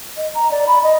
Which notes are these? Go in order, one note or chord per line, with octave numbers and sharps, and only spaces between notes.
D#5
A#5
D5
B5
D#5